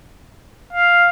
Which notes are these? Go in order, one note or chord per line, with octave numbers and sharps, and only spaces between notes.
F5